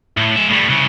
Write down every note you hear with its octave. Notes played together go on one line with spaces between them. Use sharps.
A2
G#3 E5
A2 G3
C2 C#3